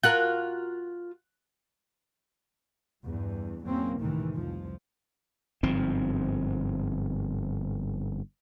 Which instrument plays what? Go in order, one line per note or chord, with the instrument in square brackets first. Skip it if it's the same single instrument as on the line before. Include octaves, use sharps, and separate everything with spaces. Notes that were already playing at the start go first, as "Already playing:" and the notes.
[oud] F4 F#4 A#4 [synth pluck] F#6
[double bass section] E2 G2 E3
E2 F#3 A#3 C4 C#4
C#2 A2 C3 D#3 E3 A3
C2 F2 F3
[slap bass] G1 G#2 F3 C4